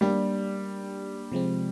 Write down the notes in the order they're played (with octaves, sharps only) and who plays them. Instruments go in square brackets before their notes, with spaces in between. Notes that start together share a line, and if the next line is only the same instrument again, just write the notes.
[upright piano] G3 [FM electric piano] A#3 D4 G4
[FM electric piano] C3 F3 G#3 C4